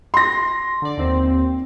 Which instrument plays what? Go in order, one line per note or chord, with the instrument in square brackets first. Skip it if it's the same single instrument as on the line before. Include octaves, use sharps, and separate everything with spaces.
[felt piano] C6 A#6
[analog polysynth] D3 D5
D#2 C4